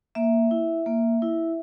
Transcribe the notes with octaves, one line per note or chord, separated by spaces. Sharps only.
A#3 E5
E4
A#3
E4